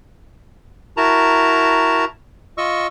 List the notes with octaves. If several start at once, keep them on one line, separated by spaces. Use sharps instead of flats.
E4 F#4 A#4 A5 A#5
F4 D#5 C#6 E6